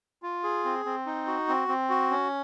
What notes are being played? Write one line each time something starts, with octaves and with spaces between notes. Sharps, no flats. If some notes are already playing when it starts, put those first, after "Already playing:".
F4
G#4
C4
C4
D#4
F#4
C4
C4
F#4
C#4